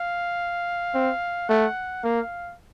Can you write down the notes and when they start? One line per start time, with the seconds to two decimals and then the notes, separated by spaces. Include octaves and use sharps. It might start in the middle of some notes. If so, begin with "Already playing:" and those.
Already playing: F5
0.94 C4
1.49 A3 F#5
2.04 A#3 F5